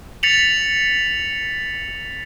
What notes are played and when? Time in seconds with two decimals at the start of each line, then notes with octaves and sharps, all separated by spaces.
0.23 A6 B6 C#7 F7 F#7